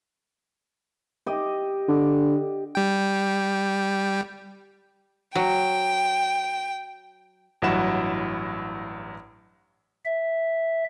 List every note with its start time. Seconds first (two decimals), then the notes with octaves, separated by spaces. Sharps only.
1.26 G4 D#5
1.88 D3
2.75 G3 G5
5.35 F#3 G5
7.62 A1 G2 F#3 E4 F#5 E7
10.05 E5